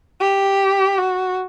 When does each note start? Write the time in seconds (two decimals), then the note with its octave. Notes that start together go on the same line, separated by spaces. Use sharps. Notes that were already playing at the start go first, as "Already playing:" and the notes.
0.20 G4
0.98 F#4